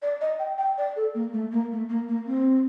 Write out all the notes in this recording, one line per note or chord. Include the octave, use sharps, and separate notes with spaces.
D5
D#5
G5
G5
D5
A4
A#3
A3
A#3
A3
A#3
A#3
C4